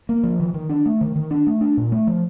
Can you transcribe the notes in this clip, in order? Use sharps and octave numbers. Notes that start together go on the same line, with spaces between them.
A#3
F3
D#3
D#3
D4
A3
D#3
D#3
D4
A3
D4
A#2
A3
F3